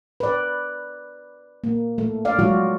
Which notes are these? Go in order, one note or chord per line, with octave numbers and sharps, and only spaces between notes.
B4 D5
A#3
A3
D5 F5
F#3 G#3 F4 F#4